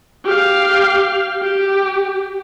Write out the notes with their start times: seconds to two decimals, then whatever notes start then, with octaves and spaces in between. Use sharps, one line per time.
0.25 G4 F5
1.42 G4